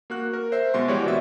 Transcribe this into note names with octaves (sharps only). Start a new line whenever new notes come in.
A#3 F#4 F#6
A#4
C5 E5 C7
B2 G#3 C6
E3 G#3 F#4 G4 C#5 D5
D#2 B2 E4 E5 C#6